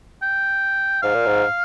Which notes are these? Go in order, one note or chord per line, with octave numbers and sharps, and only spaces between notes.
G5
G#2 F5
A#2
G#2